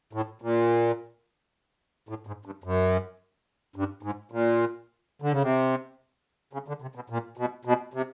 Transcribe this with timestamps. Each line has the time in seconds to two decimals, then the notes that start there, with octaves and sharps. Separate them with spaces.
0.13 A2
0.42 A#2
2.09 A2
2.27 G#2
2.45 G2
2.64 F#2
3.76 G2
4.03 G#2
4.32 A#2
5.22 D3
5.32 C#3
5.42 C3
6.53 C#3
6.68 D3
6.82 C3
6.95 B2
7.10 A#2
7.37 B2
7.65 B2
7.94 C3